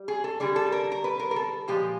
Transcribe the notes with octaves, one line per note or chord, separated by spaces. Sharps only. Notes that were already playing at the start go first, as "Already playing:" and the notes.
Already playing: G3
G#4
A4
D3 G3 G#4
A4
A#4
A#4
B4
A#4
A#4
A4
A#2 F3 G#3 G4